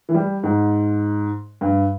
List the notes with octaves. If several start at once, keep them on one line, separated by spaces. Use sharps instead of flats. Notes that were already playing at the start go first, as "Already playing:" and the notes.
E3
G3
G#2
G2